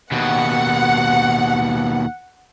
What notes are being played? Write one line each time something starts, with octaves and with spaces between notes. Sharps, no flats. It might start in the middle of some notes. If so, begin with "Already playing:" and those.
D#2 B2 F#5